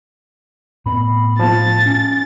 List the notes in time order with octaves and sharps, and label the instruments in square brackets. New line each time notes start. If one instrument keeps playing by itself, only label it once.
[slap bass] A2 B3 C4 [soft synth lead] B5
[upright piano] F3 [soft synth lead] A5 [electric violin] A6
[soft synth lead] C#4